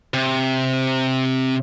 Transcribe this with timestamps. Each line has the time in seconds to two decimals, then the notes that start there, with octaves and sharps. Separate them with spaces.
0.14 C3